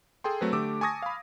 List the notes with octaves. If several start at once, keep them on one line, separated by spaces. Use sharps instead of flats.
G#4 A4 G5 C6
F#3 A3 C4 B4
D3 A3 G4 D6 E6
G#5 A5 C#6 D#6 G#6 A#6
F5 B5